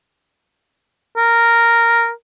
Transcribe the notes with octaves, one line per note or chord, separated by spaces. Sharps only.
A#4